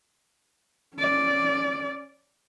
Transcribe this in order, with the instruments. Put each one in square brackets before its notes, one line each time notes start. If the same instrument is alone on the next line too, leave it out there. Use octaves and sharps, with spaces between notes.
[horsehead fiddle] C#4 D5